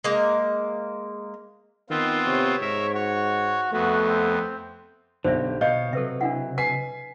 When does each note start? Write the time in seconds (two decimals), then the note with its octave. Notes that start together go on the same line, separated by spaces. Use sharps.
0.04 G#3 A#3
1.90 D#3 B3 C4 F4
2.27 C3 C#5
2.61 G#2 A#4 E5
2.94 F#4 C#5
3.73 F2 A3 B3 F#4
4.09 C4
5.24 B1 D3 G4 C5 D5 E5
5.61 B2 B3 C#5 D#5 F5 G6
5.93 C3 F#3 A4 B4 E5
6.21 D4 E4 F5 F#5
6.58 B4 G#5 B6 C7